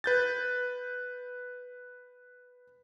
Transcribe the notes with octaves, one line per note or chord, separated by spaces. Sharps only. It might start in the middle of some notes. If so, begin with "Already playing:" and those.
B4 G6 A6